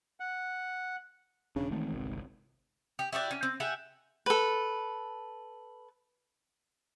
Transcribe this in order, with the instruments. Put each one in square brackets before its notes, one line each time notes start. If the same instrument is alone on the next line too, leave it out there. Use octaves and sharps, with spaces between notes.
[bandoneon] F#5
[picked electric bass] E1 D4 [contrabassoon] C#3
[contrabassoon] G#1 [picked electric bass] D#3 E3 A3
[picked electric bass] G1 C2
[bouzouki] G4
E4 F#4 G4 D5
C#4
C4
G4 E5 F#5 G#5
[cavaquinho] A4 B4